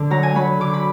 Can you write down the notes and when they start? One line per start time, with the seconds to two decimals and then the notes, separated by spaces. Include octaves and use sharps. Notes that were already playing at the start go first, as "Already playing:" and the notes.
Already playing: D3
0.10 F#3 A#5
0.23 G#5
0.35 F#3 B5
0.60 D3 D6
0.74 B5